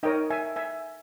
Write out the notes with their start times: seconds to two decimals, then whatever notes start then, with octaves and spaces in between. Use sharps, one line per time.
0.03 D#4 A#4 C#5 D#5 G5
0.30 E5 G#5
0.56 E5 G#5